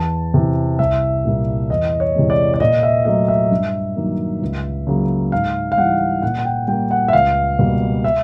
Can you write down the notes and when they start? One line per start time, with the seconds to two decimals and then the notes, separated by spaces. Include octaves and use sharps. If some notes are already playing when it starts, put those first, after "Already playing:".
Already playing: E2 A5
0.34 C3 E3
0.79 C2 E5
1.25 A#2 G3 A#3
1.70 E2 D#5
2.00 C#5
2.15 C3 E3 G#3
2.30 D5
2.54 D5
2.60 A#2 D#5
2.83 E5
3.05 F#3 A3 D#5
3.28 E5
3.51 G2
3.96 D#3 F#3 A#3
4.42 C#2
4.87 C#3 F#3 A#3
5.32 G#2 F5
5.72 F5
5.78 E3 G3 F#5
6.22 A#2 F#5
6.39 F#5
6.45 G5
6.68 G3 A#3 G5
6.91 F#5
7.08 E5
7.13 C#2 F5
7.59 B2 G3 A#3
8.04 E5